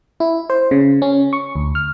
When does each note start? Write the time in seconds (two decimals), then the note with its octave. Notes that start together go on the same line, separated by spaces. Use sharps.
0.20 E4
0.50 C5
0.71 C#3
1.02 C#4
1.33 C#6
1.56 D2
1.75 F6